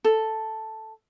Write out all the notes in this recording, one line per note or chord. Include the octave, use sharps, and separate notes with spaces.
A4